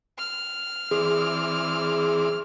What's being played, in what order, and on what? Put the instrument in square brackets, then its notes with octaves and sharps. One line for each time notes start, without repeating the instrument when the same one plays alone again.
[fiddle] F6
[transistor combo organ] E3 C4 D5 [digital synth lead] G#4